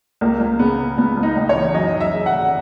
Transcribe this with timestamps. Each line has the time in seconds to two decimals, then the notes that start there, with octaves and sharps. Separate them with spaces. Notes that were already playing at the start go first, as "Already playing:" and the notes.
0.21 C#2 A#3
0.40 C#2
0.59 C#3 B3
0.78 C#3
0.98 C#2 B3
1.17 C#2
1.23 D#4
1.36 C#2
1.49 C#5
1.55 E3
1.74 F#2 D#5
1.94 F#2
2.00 E5
2.13 C#3
2.26 F#5
2.32 G#1